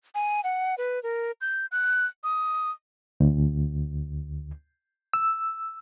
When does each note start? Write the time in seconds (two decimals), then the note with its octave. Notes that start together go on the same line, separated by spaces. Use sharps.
0.15 G#5
0.44 F#5
0.78 B4
1.03 A#4
1.41 G6
1.72 F#6
2.24 D#6
3.20 D2
5.13 E6